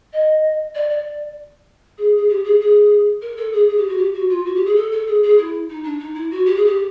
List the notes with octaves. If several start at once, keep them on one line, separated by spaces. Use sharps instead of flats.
D#5
D5
D5
G#4
G#4
G4
G#4
G#4
A#4
A4
G#4
G#4
G4
F#4
G4
F#4
F4
F#4
G4
G#4
A4
A4
G#4
G#4
E4
D#4
D4
D#4
E4
F#4
G4
G#4
G4